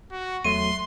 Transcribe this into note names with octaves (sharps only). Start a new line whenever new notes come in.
F#4
E2 F#3 A3 C6 D#7